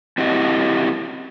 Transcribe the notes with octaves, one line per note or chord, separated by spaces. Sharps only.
C4 E4 F#4 G4 D#5